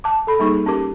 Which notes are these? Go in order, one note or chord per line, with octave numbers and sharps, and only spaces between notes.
A5 D6
A4 B5
G3 A#3 D#4 G#4 C#6
C#4 G4 A#4 D6